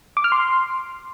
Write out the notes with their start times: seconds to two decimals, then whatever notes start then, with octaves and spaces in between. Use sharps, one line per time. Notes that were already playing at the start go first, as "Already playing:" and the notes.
0.17 D6
0.24 F6
0.32 C6